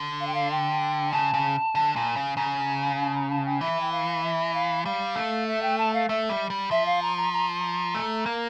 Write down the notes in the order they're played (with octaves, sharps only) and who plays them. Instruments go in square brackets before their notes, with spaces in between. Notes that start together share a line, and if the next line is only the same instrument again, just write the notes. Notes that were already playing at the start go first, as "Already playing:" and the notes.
Already playing: [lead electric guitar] D3
[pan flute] F5
G5
F5
G5
[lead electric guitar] C#3 [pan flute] A5
[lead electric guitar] C#3
D3
A#2
C#3
[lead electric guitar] C#3 [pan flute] A#5
[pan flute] A#5
A5
A#5
A5
G5
[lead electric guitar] E3 [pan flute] E5
[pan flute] G5
F5
E5
F5
[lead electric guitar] G3 [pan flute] F5
[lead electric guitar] A3
[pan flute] E5
G5
A5
F5
[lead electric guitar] A3 [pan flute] E5
[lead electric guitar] G3
G3
[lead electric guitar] F3 [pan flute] E5
[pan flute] F5
A#5
A#5
A#5
A#5
[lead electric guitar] A3
A#3